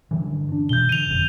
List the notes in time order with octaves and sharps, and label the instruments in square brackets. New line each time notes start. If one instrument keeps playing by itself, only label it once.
[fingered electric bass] G2 D3 E3
D4
[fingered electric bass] B2 E3 [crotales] G6 G7
[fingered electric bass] D3 [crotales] D#7 F7
[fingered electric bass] F#1 F2